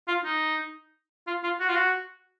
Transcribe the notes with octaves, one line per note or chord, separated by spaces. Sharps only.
F4
D#4
F4
F4
F#4
F4
F#4